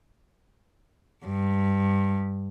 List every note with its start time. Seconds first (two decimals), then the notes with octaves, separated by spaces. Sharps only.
1.25 G2